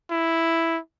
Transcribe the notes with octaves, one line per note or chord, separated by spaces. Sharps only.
E4